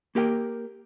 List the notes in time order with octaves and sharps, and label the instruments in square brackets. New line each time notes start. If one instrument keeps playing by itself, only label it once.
[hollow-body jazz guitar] A#3 G4 A#4 G5